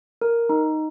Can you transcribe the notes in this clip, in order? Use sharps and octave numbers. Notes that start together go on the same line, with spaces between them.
A#4
D#4